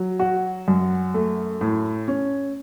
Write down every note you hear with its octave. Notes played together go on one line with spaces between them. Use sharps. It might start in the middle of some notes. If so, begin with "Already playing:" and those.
Already playing: F#3
F#4
F#2
A3
A2
C#4